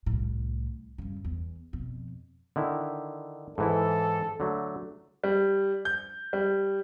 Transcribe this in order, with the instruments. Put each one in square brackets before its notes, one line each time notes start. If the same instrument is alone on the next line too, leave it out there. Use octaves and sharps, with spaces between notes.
[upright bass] C2 A2
G2 C#3
E2
F2 B2
[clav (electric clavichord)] D3 D#3 E4
[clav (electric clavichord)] G#2 E3 E4 [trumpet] A4
[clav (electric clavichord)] D3 F#3 A3
[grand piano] G3
G6
G3